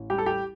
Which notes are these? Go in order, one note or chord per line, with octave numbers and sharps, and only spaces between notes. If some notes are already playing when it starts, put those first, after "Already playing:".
Already playing: A1
G3 G4
A4
G4